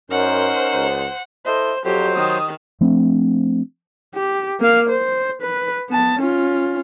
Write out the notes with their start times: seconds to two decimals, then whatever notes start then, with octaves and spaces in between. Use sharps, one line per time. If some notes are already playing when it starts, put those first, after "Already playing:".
0.11 F#2 C#4 D#4 A#4 C5 F#5
0.74 C#2
1.45 E4 A4 C5 D#5
1.85 F2 F#3 G4 C5
2.16 D#3 D#6
2.81 F3 A3 C4 D4
4.14 G4
4.60 A#3 F5
4.89 C5
5.42 B4
5.90 B3 A5
6.19 C#4 F4